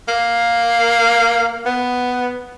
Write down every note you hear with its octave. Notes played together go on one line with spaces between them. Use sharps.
A#3
B3